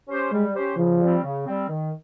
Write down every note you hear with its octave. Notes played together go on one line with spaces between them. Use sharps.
C#4 G4 C5
G3 G#3
C#4 G4 C5
C#3 F3
G3 C4
C#3
G3 C4
D#3